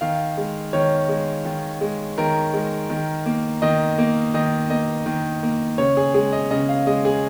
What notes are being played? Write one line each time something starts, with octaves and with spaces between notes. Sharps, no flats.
D#3 F5
G#3
D#3 C#5
G#3
D#3
G#3
D#3 A#4
G#3
D#3
A#3
D#3 D#5
A#3
D#3 D#5
A#3 D#5
D#3
A#3
C#3 C#5
G#4
G#3 G#4
D#5
C#3 D#5
F5
G#3 D#5
G#4